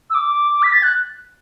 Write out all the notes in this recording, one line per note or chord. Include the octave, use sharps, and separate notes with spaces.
E6
D6
B6
A6
F#6